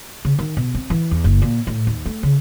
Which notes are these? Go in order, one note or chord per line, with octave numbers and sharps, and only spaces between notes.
C#3
D#3
B2
C4
E3
E2
F#1
A#2
A2
D#2
A3
C#3